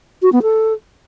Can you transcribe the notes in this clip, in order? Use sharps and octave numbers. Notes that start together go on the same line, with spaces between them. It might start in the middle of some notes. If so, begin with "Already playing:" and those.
F#4
B3
A4